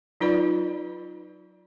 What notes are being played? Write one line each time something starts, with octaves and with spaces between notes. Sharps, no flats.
F#3 D#4 F4 B4 D5 B5